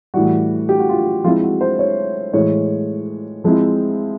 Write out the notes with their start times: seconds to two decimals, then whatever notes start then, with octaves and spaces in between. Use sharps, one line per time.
0.14 A2 E3 G3 F#4
0.69 G4
0.79 F#4
0.89 F4
0.99 F#4
1.24 F3 G#3 C4 E4 F4
1.43 F#4
1.61 C5
1.79 C#5
2.34 A2 E3 G#3 C#5
3.44 F3 G#3 C4 E4